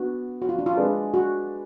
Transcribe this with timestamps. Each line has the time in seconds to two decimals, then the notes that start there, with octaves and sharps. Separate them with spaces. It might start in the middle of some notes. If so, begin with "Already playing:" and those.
Already playing: B3 D4 F#4
0.42 F#4
0.49 F4
0.59 D4
0.66 F4
0.77 G#3 D4 G#4 B4 D5
1.14 F#4